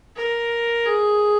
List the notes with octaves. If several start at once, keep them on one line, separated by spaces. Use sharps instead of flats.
A#4
G#4